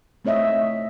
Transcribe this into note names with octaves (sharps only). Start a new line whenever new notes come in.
A3 C4 C#5 D#5 E5